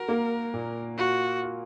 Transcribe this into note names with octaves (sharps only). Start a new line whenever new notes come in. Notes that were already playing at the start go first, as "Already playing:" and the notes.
Already playing: F#4 A#4
A#3
A#2
F4 F#4
F4